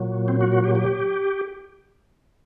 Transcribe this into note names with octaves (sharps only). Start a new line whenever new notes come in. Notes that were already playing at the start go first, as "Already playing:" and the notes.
Already playing: A#2 F#3
C4
F#4
F#4
G4
G4